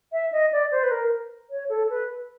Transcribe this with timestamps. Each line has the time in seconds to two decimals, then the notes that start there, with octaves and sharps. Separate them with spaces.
0.12 E5
0.32 D#5
0.52 D5
0.71 C5
0.83 B4
0.91 A#4
1.50 C#5
1.69 A4
1.90 B4